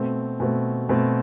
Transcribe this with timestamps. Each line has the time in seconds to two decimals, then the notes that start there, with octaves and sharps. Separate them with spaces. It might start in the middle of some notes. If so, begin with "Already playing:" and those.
Already playing: B2 A3 C4
0.40 B2 A3 C4
0.89 B2 A3 C4